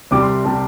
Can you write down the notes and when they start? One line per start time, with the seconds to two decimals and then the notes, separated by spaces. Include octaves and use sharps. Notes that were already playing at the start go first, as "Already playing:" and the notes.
0.11 C2 C3 G3 D6
0.23 C6
0.45 C3 G3 A5